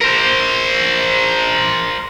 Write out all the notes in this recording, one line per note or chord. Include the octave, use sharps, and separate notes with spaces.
A#4 C5